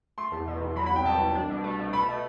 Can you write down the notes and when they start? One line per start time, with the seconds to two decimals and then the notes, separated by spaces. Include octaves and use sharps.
0.18 A3 C6
0.32 E2
0.48 B2
0.61 E2
0.76 F#3 B5
0.86 B5
0.91 C2 G5
1.05 B2 A5
1.20 C2
1.35 D4
1.50 B2
1.64 A3
1.79 B2
1.93 A3 B5
2.09 B2